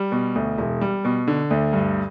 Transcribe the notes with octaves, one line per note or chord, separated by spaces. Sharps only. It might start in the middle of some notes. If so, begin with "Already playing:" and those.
Already playing: G3
B2
D2
E1
G3
B2
D3
D2
G2